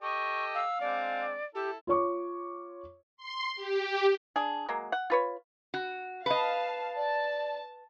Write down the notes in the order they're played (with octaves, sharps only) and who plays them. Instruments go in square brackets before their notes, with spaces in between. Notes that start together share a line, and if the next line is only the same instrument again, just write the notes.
[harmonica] G4 A4 D#5 [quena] C#6
[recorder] F5 [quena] E6
[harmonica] G#3 C4 D4 [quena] D5
[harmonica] E4 A4 [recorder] G4
[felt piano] F4 C#5 C#6 D6
[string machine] C6
G4
[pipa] D4 G#4
F#3 G#3 A#3
F#5
F4 B4 C#5
[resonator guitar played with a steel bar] F#4
[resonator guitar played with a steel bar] B4 D#5 [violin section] F5 A5
[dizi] D5 [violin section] A5